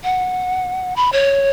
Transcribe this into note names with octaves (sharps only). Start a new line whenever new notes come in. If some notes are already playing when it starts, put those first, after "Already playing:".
F#5
B5
C#5